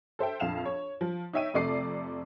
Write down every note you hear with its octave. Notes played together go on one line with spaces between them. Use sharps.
A4 C5 E5 G5
A#1 F2 F5 E7 F7
C#5
F3
D#4 C#5 E5 G5 D#7
F2 C3 A3 D5 D6 C7